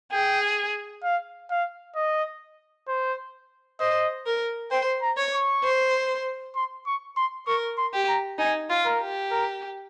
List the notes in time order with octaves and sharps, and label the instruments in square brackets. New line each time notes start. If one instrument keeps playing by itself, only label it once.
[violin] G#4 [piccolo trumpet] G5
[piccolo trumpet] F5
F5
D#5
C5
[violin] C5 [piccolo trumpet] D#5
[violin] A#4
[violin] C5 [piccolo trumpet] G5
[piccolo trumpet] A#5
[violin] C#5
[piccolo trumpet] C#6
[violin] C5
[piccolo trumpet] C6
C#6
C6
[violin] A#4 [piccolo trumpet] C#6
[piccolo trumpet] C6
[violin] G4
[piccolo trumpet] A#5
[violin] D#4 [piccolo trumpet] G#5
[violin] F4
[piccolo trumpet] A#4
[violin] G4
[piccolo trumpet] A#4